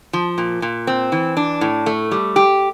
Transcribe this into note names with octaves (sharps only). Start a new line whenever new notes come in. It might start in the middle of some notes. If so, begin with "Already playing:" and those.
F3
A#2
A#2
C4
E3
D4
A2
A3
G3
G4